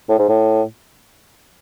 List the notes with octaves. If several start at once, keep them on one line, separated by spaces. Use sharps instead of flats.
A2
G#2
A2